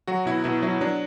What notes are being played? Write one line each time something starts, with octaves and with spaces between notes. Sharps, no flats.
F#3 F#4
B2 E4
B2 E4
F#3 E4
F#3 D4